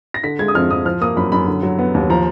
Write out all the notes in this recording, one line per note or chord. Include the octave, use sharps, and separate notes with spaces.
A#6
D3 B6
G#3 G#6
D#6
F2 F6
F2 D#6
F3 F6
A#3 D#6
F#2 B5
F#2 B5
D3
F#3
B3
D#2
F3 A#5